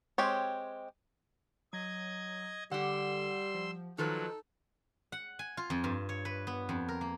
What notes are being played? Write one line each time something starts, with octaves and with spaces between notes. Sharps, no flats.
G#3 C4 G4 C#5
F#3 D#5 G#6
D3 G3 G4 F#5 C6 E6
F3
D#3 F3 F#3 D#4 A4 B4
F#5
G#5
F4
F2
G2
C#5
B4
B3
F2
A#4
A#3